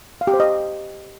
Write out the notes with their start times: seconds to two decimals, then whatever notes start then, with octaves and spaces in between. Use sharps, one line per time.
0.21 F5
0.27 G4
0.34 C5
0.40 D#5